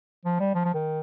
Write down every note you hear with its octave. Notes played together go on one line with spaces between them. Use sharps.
F3
G3
F3
F3
D#3